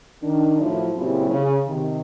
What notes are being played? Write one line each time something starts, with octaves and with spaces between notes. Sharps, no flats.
D#3 D4
A2 F3 F#3 E4
A#2 C#3 F#3 C4 E4 G4
C#3
C3 D#3